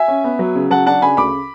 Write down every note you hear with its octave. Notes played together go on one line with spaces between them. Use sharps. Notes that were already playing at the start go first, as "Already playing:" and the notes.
Already playing: E5 G#5
C#4
B3
F#3
C#3
F#3 F#5 A5
D4 F#5 A5
C#3 G#5 B5
D2 B5 D6